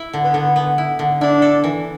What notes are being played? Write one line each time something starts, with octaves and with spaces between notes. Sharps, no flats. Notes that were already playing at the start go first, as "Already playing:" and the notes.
Already playing: E4
D3
B3
D3
B3
E4
D3
D4 E4
A4
E3